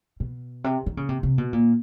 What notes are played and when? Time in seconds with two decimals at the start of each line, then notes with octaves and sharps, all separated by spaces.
0.20 B2
0.64 C3
0.86 D#3
0.97 C#3
1.09 C3
1.23 C3
1.38 B2
1.53 A#2